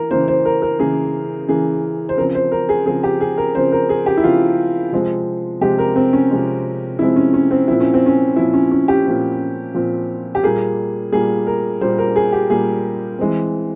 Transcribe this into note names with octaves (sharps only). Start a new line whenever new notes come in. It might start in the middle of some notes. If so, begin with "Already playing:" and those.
Already playing: E3 A#3 A#4
C#3 E3 A#3 C5
C5
A#4
A#4
C#3 E3 A#3 G#4
C#3 E3 A#3 G#4
C5
C#3 F3 C4 A#4
C5
A#4
G#4
C#3 F3 C4 G#4
G4
G#4
A#4
C#3 F3 C4 C5
A#4
G#4
G4
E4
C#3 F3 C4 F4
C3 F3 G#3 C4
C3 F3 G#3 C4 G4
A#4
C4
C#4
C3 F3 G#3 C4
C3 F3 G#3 C4 E4
C#4
C#4
C4
A#2 F3 C4 E4
C#4
C4
C#4
A#2 F3 C4 E4
C#4
C#4
G4
A#2 F3 C4
A#2 F3 C4
G4
A#2 G3 A#3 G#4
A#2 G3 A#3 G#4
A#4
A#2 G3 A#3 C5
A#4
G#4
G4
A#2 G3 A#3 G#4
E3 G#3 C4